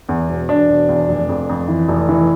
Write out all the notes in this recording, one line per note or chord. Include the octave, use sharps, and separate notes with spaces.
E2
E1
E1 D4
E1
E2
F1
F2
F2
E3
F1
E3